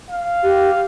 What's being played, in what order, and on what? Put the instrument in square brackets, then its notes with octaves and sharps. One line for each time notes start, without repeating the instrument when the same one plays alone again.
[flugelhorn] F5
[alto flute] G4